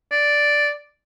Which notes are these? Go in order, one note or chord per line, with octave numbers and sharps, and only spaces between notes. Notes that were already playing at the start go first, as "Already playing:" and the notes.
D5